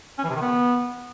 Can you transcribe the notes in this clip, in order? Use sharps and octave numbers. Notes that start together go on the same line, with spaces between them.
C#4
E3
C3
D#3
B3